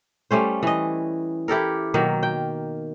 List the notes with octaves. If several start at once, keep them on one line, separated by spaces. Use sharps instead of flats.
G3 A3 C#4 C5
E3 D#5
E4 G4 A4 A#4
B2 D#3 F#3 A#3
G5